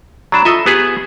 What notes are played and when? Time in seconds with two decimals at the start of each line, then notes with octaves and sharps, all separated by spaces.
0.32 F#3 D4 A#5 B5 E7
0.45 F4 A4 D#5 E5 D#6 E6
0.66 B3 G4 G#4 B4 F#7